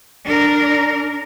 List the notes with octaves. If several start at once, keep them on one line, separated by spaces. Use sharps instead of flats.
D4 A#4